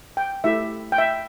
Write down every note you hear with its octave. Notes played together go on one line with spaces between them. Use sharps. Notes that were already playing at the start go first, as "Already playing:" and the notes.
G5
A3 E4 G4 E5
G5
E5